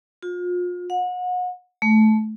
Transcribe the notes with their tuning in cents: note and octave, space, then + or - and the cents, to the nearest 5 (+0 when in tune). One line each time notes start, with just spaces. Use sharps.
F4 +35
F#5 -35
A3 -20